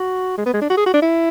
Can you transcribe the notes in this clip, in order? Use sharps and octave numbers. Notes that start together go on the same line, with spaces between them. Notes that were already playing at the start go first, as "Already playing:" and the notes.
Already playing: F#4
G#3
B3
G#3
D4
F#4
G#4
F#4
D4
E4